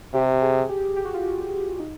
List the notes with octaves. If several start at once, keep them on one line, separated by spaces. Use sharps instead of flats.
C3 G4
G#4
G4
G4
F#4
F4
F#4
D#4